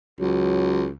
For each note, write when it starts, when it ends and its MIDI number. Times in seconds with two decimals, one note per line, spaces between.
0.20 0.91 37
0.20 0.86 54